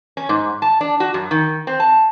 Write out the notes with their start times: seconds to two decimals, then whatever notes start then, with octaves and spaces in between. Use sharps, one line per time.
0.17 C#4
0.29 G#2
0.62 A5
0.81 D4
1.00 F#4
1.14 F#2
1.31 D#3
1.67 C4
1.80 A5